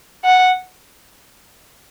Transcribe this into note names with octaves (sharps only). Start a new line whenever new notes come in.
F#5